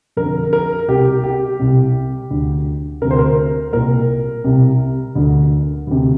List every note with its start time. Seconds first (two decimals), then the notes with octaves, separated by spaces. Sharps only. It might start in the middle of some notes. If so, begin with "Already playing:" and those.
0.17 F2 D3 A#4
0.53 A#4
0.88 C2 C3 G4
1.24 G4
1.59 C2 C3
2.31 D2 D3
3.01 D2 C3 A#4
3.11 C5
3.19 A#4
3.73 C2 A#2 A#4
4.44 C2 C3
5.15 D2 D3
5.87 D2 C3